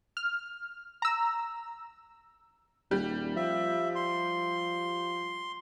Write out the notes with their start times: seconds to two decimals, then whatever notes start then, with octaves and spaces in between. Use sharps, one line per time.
0.17 F6
1.02 A#5 E6
2.91 D#1 G3
3.36 F3 E5
3.95 C6